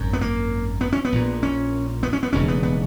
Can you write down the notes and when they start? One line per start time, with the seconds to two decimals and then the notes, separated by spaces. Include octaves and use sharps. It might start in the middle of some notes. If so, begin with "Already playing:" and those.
Already playing: G#1 F#2
0.13 B3
0.21 A#3
0.81 B3
0.93 C#4
1.05 B3
1.12 A#1 A#2
1.43 C#4
2.03 B3
2.13 C#4
2.23 B3
2.33 E1 D#2 C#3 C#4
2.48 B3
2.63 B3